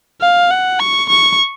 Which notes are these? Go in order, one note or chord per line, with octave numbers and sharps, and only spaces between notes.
F5
F#5
C#6
C#6